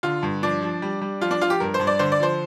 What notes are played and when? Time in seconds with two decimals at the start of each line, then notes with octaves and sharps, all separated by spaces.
0.03 D3 F4
0.23 G2
0.43 F3 D4
0.62 F3
0.82 G3
1.01 G3
1.21 F3 F4
1.31 D4
1.41 F3 F4
1.50 G4
1.60 G2 A#4
1.74 C5
1.80 G2
1.87 D5
1.99 D3 C5
2.12 D5
2.20 F3 C5